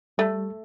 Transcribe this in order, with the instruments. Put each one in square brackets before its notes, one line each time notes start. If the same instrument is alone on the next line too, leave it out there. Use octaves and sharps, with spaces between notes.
[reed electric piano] G3 [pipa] A3